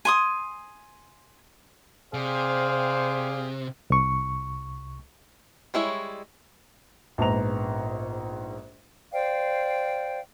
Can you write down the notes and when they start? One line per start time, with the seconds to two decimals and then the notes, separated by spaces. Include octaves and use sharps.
0.05 G#5 C6 D#6
2.14 C3 G#4 C5 D5 F5
3.90 C2 C#6
5.74 G3 G#3 E4 C#5
7.18 A#1 G#2 B3 A#5 F7
9.12 C5 D5 F5 G5